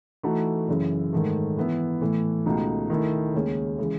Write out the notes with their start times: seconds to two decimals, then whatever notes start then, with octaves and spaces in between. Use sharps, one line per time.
0.23 E3 A3 D#4 F#4 A4
0.68 F#2 C#3 E3
1.13 G#2 D#3 A3
1.57 E3 B3 E4
2.01 A2 E3 A3
2.45 C#2 B2 A3 D#4
2.90 D#3 A3 E4 A4
3.34 D#2 C#3 G#3 C#4 G#4
3.78 C#3 E3 G#3